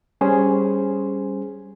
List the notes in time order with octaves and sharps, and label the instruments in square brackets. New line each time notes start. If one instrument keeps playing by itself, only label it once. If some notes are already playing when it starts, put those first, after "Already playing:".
[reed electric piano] G3 C#4 G#4 C5